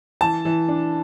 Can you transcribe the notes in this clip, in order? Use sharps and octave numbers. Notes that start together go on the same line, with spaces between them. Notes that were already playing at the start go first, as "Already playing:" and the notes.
E3 A5
E3
D4